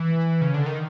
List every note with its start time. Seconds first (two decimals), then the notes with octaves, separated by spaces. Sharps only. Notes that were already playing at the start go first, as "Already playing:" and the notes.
Already playing: E3
0.41 C#3
0.54 D3
0.66 D#3